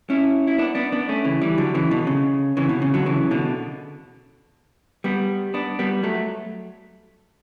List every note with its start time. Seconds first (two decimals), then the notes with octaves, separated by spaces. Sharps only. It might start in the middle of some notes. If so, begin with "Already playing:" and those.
0.10 C#4 E4
0.47 E4
0.58 B3 D4
0.75 B3 D4
0.92 B3 D4
1.09 A3 C#4
1.24 C#3 E3
1.42 E3 G3
1.58 D3 F#3
1.74 C#3 E3
1.91 B2 D3
2.07 C#3
2.57 C#3 E3
2.69 B2
2.82 C#3
2.94 D3 F#3
3.06 C#3 E3
3.31 B2 D3
5.04 G3 B3
5.54 B3 D4
5.79 G3 B3
6.03 F#3 A3